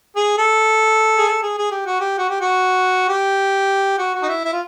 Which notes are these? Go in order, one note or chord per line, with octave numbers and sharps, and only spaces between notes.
G#4
A4
G#4
A4
G#4
G#4
G4
F#4
G4
F#4
G4
F#4
G4
F#4
F#4
D#4
E4
E4
F4